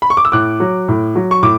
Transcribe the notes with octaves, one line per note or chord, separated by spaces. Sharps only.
B5
C#6
D6
E6
A2 D6 F#6
F#3
A2
F#3
C#6
A2 D6